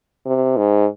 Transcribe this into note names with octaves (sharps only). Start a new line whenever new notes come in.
C3
G#2